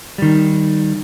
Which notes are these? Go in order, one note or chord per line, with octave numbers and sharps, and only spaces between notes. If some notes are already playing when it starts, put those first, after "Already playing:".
D#3 G3